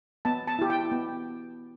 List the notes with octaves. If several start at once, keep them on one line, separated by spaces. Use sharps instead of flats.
B3 A5
A5
E4 G4
G5
B3